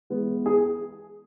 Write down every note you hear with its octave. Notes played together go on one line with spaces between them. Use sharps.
E3 G#3 B3
G#4